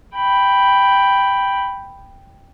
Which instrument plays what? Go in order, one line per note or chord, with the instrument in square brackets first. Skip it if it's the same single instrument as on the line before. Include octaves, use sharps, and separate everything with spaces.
[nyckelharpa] G5 B5